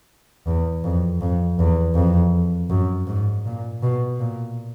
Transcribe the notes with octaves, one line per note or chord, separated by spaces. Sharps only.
E2
F2
F2
E2
F2
F#2
G#2
A#2
B2
A#2